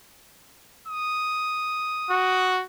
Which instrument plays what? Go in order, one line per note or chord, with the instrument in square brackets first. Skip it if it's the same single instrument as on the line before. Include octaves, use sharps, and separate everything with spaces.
[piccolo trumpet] D#6
[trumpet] F#4